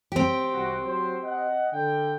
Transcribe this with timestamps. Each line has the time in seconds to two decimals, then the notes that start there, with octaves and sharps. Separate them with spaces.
0.12 C4 G4
0.53 C2 F#4
0.85 F#3 F#4 C5
1.24 D#5 F#5
1.72 D3 G5